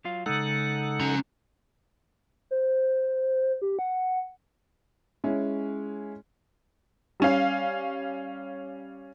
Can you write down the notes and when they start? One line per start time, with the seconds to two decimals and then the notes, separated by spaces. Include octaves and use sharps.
0.05 F#3 F4 F5
0.26 C#3 G#3 D#4 A4 F#5
1.00 C#4 A#5
2.51 C5
3.62 G4
3.79 F#5
5.24 G#3 C#4 E4
7.20 G3 C#4 F5